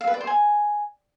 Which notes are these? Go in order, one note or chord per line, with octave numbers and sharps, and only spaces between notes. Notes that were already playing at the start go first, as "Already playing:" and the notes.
F5
B4
D5
C5
G#5